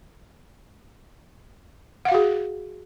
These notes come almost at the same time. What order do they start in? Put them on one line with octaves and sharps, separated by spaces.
F#5 F5 F#4 G#4